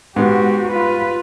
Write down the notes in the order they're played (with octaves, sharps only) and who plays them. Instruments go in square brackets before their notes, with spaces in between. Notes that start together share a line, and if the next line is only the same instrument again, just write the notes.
[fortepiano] G#2 B3 [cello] F#4 G4
[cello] F4 B4